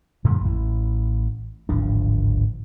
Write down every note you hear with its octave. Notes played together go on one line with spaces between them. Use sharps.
F2 A#2 D3 G3
A1 E3
D1 G#1 F3 D4